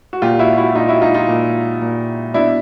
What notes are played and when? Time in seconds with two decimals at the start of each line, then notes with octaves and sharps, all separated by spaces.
0.13 F#4
0.22 A#2 F4 G4
0.39 E4 F#4
0.57 E4 F#4
0.75 A#2 D#4 F4
0.88 E4 F#4
1.01 D#4 F4
1.14 D#4 F4
1.28 A#2
1.82 A#2
2.34 B2 D4 E4